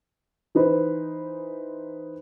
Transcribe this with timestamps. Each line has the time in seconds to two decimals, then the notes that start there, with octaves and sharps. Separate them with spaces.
0.55 E3 D#4 B4 C5